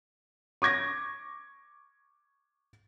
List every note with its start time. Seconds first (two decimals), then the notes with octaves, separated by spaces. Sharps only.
0.62 C#6 D6 G#6 A#6